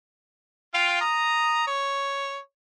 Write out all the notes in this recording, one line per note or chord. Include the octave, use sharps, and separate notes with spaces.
F4 F5 G5
A#5 D#6
C#5